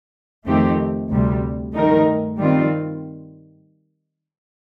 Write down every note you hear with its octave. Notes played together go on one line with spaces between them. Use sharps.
F2 D#3 A3 C4 G4
D2 C3 G3
G2 D#3 A3 D#4 A#4
D#3 G3 C4 F4